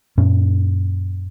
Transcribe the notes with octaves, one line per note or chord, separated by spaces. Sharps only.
F#2 A#2 C#4